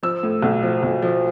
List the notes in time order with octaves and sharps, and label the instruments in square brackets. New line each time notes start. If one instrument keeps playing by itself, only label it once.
[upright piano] F3 E6
A2
B1
F3
B1
F3